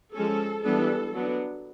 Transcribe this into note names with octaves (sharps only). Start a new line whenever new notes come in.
F3 G#3 C#4 A4
E3 G3 B3 D4 A4
F#3 B3 D4